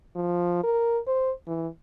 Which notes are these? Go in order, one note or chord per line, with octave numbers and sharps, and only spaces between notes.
F3
A#4
C5
E3